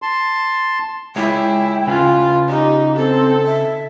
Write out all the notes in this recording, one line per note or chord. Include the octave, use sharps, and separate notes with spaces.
A5 C6
G#3 E4 G#4 C#5 G5
C#3 C#4 F4 B4
D#4 G4
C4 A4
E5